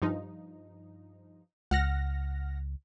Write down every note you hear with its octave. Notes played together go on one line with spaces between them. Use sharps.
G2 F3 D#4
C#2 F#5 F6 A#6